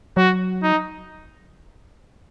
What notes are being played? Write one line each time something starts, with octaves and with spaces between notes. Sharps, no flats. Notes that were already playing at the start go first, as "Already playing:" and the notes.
F#3 F#4
D#4